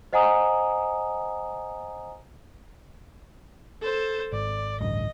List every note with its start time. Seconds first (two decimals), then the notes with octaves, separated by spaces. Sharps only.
0.13 C5 D#5 F#5 G#5 A#5 D#6
3.81 A4 C5
4.32 G#1 D5
4.80 A1 D2 G2 D#5